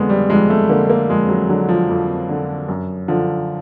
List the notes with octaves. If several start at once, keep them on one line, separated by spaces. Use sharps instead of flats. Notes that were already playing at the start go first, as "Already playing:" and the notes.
Already playing: F2 D3 G#3 B3
G3
F2 G#3
A3
D3 A#3
A#3
F2 G#3
F#3
D3 F#3
F3
F2
D3
F#2
D3 F3